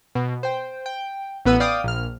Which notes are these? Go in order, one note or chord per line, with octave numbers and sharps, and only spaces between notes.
B2
C5 G5
G5
A1 B3 B4 E6 D#7
D5 F5 G5 D6 D#6
A#1 F6